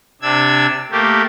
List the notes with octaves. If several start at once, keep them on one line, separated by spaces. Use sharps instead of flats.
C3 D4 E6 G#6
A3 A#3 G4